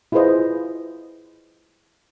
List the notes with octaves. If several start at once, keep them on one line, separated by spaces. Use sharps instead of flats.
E4 F4 G#4 B4 C5 D#5